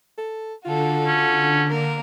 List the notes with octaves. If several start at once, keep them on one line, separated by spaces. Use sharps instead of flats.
A4
D3 F4 F#4 A4
C#4
A#3 A#4